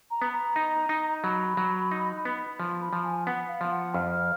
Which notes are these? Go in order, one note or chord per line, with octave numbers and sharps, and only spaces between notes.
A#5
B3
A#5
D#4
D#4
F#3 B5
F#3
D#4
B3
F3
B5
F3
G#5
B3 F#5
F5
F3
F#5
F2 F6